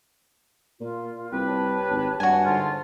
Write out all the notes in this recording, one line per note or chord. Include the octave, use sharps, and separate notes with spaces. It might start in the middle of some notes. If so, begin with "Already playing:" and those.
A#2 F4
C2 G4 B4
C#5 A5
G#1
G2 F#4 G#5
G#2 D3 F4